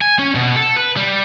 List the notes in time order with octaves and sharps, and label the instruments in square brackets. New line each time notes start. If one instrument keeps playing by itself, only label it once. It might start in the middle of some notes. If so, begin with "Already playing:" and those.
[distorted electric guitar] G#5
C#4
B2
A4
B4
G3